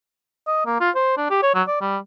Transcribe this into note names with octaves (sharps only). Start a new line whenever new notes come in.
D#5
A#3
F4
C5
D4
G4
C#5
F#3
D5
G3